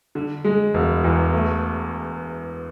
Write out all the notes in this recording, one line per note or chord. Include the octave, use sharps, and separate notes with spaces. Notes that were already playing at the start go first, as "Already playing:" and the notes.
D3
G#3
E1
E2
A3